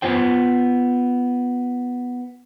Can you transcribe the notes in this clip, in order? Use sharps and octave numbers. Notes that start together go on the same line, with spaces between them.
B3 F4 C5 G5